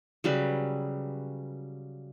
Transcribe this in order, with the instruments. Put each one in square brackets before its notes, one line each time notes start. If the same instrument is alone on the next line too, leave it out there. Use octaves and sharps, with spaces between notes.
[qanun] C#3 F#3 G3 B4